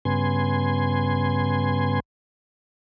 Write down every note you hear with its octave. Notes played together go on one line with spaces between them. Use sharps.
G2 C#3 B3 G#5 C6